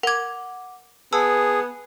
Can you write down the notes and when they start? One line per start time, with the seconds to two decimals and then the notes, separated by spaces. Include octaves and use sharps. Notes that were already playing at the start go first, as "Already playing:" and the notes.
0.03 A#4 F#5 D6 G#6
1.13 B3 G#4 A5 E6